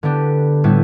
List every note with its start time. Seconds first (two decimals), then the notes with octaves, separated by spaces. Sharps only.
0.03 D3 B3 D4 G4
0.64 A2 G3 B3 E4